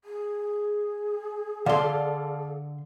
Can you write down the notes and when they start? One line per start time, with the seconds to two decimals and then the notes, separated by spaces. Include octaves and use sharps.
0.04 G#4
1.66 D3 A4 D5 F5 C6